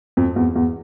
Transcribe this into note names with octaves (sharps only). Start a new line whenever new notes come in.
F2
E2
E2